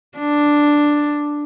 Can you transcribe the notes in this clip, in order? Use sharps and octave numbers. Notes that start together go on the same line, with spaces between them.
D4